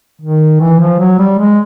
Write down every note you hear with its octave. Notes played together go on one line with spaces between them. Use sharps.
D#3
E3
F3
F#3
G3
G#3